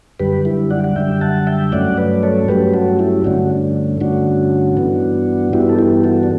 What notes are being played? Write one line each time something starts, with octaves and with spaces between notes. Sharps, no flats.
F#2 D3 G3 G4 B4
E4 G4
D5 F#5
F#5
F#2 D3 G3 E5 G5
F#5 A5
E5 G5
G2 F#3 A3 C#4 D5 F#5
B4 D5
A4 C#5
G2 F#3 A3 C#4 G4 B4
F#4 A4
E4 G4
G2 D3 A3 C#4 D4 F#4
D4
G2 D3 A3 C#4 D4 F#4
G2 E3 B3
G2 E3 B3 E4 G4
A4
E4 G4
F#4 A4
D4